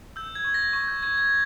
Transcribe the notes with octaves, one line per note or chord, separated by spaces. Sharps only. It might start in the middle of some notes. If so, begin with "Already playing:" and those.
E6 G6
G#6
C#6
A#6
C#6
G6
C#6 G#6
G#6